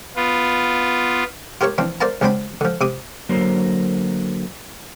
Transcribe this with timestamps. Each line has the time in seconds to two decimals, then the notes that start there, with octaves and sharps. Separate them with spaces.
0.16 B3 F4
1.61 F4 G4 A#4 C#5 C#6
1.78 E3 F3 C4 D4
2.01 A#4 C5 D5 F5 A5 A#5
2.21 C#2 F#3 C4 D4 G5 B5
2.61 D3 F3
2.81 C3 D6 D#6
3.29 D3 F#3 A#3 A#4 C5